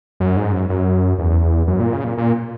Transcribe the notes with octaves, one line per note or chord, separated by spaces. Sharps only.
F#2
G#2
F#2
F#2
E2
F#2
A#2
C#3
A#2
A#2